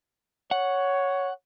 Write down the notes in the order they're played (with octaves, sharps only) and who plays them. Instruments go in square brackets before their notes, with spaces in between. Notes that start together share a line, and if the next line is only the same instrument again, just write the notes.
[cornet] C#5 [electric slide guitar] F#5